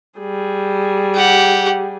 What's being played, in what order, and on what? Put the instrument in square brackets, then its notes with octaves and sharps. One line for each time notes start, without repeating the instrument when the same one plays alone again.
[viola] G3 G#4
[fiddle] G4 F#5